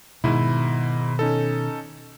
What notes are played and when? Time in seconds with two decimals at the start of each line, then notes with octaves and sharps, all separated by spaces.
0.24 G#2 B2 D#3 E4
1.19 C#4 D#4 A4